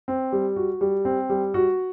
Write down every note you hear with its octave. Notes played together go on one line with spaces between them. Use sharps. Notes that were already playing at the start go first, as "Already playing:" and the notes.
C4
G3
F#4
G3
C4
G3
F#4